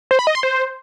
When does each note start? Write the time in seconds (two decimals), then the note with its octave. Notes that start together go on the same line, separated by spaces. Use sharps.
0.11 C5
0.19 B5
0.27 D#5
0.35 C6
0.43 C5